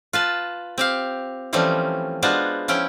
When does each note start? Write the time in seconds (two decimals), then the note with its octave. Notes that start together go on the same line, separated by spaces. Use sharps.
0.13 F4 B4 A5
0.78 C4 G4 F5
1.53 E3 F3 G3 A3 C4 C#4
2.22 G#3 B3 D4 F4 F#4 C5
2.68 F3 C#4 E4 G5